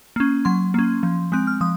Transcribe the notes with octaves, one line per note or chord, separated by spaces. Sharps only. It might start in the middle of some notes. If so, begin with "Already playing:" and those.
A#3 C#4
F#3 C6
A#3 C#4
F3
G#3 C4 F#6
F6
F3 D#6